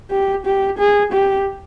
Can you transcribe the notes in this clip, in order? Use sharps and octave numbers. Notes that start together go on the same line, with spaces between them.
G4
G4
G#4
G4